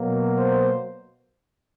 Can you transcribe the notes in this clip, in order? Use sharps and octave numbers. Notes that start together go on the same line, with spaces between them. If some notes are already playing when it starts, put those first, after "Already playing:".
Already playing: B2 F#3 A#3
C5